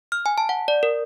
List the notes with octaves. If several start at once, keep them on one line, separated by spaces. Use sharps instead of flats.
F6
G#5
A5
F#5
D5
A#4